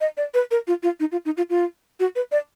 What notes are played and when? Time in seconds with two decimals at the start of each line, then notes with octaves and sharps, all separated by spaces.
0.01 D#5
0.17 D5
0.34 B4
0.51 A#4
0.68 F4
0.83 F4
1.00 D#4
1.12 F4
1.25 D#4
1.37 F4
1.50 F4
2.00 F#4
2.16 B4
2.32 D5